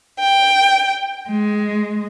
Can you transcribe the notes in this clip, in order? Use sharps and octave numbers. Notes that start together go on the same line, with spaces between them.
G5
G#3